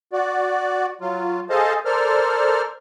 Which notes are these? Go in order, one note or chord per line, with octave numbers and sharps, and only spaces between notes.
F#4 D5
F#3 F4
G#4 A4 C5 D#5 F5 A5
A4 A#4 C5 D5 F6